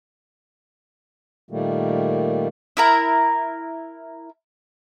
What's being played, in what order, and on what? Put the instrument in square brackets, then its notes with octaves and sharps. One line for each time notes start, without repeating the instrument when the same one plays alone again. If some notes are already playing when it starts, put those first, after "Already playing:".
[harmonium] A#2 D#3 G3 A3 A#3
[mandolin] E4 A#4 A#5